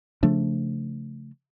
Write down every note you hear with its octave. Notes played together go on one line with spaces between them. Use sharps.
C#3 F3 A3 D4